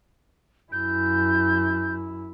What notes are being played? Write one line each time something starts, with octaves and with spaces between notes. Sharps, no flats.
F#2 E4 G6